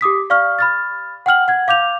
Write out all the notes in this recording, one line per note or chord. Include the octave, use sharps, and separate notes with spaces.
G4 D6 D#6 B6
D5 F5 C#6 F6
B5 F6 A6
F#5 G5 F6 F#7
F#5 G#6
F5 D6 G6 F7